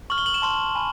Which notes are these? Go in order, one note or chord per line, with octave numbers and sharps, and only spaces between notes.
C#6 F6 F#7
G7
F#7
E7
A5 C6 F6
G#5 B5